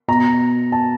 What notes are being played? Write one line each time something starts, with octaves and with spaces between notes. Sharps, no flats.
B2 A#5
A5